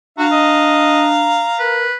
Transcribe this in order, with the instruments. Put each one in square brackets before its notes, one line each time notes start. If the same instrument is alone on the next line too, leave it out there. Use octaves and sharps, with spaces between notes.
[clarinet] D4 [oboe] F#4 [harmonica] F5 A#5
[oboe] D#5
[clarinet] A#4 [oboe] B4